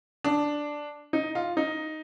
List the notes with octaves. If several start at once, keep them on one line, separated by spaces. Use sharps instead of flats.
D4
D#4
F4
D#4